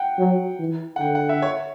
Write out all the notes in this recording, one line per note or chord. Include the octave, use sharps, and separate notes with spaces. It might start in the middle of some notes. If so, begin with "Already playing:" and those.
Already playing: F#5 G5
F#3
E3
F#5
D3 G5
F#5
E5
C#5